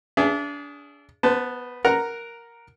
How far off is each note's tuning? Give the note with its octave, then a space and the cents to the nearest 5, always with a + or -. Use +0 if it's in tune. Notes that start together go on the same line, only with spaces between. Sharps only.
D4 -30 G#4 +0 E5 +30
B3 +0 C5 -35 A5 +0
A#4 +0 F#5 +0 A#5 -5